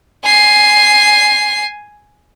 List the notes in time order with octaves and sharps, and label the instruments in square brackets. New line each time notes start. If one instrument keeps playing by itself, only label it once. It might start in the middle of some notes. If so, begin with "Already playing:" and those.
[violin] G#5 C7